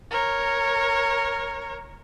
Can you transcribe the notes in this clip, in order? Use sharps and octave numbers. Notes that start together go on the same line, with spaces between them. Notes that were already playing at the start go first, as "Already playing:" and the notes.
A#4 C#5